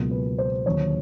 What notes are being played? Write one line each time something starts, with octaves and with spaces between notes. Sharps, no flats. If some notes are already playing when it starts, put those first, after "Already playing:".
Already playing: C#2 B2 F#3 A#3
B4
C5
D#2 D3 F#3 C#5